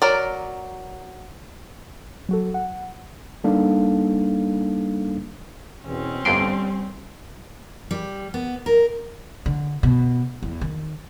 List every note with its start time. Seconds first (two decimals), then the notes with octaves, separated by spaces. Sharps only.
0.02 F#3 A#4 D5
2.29 F#3 F#4 A4
2.54 F#5
3.44 G3 A#3 D4 D#4 A4 F5
5.86 E2 B2 C4 C#4
6.25 G1 F2 G3 C6 D7
7.91 G3
8.34 B3
8.66 A#4
9.46 D3
9.83 B2
10.43 E2
10.61 D#3